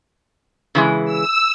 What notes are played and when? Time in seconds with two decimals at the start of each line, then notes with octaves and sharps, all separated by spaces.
0.75 C#3 E3 G#3
1.05 E6